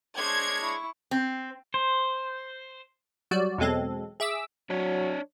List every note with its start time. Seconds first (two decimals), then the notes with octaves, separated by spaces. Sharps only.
0.18 G#3 D4 C5 C#5 G#6
0.61 E4 C#6
1.11 C4
1.74 C5
3.31 F#3 G3 F#4 D5
3.58 E2 B2 F#3 G#3 C4 A4
4.20 G#4 E5 D6 E6
4.70 F#3 D4 C#5